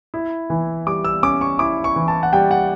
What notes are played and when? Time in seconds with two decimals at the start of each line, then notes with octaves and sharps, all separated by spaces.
0.14 E4
0.50 E3
0.86 G3 D6
1.05 E6
1.23 C#4 D6
1.41 C#6
1.59 E4 D6
1.84 C#6
1.96 E3
2.08 A5
2.23 F#5
2.33 G3 G5
2.51 F#5